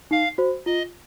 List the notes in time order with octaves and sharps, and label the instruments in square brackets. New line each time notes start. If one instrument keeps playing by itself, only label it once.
[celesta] D#4 [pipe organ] F5
[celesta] F#4 C5
[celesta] F4 [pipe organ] D#5